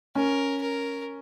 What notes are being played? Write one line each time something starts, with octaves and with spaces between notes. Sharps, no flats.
C#4 A#4
A#4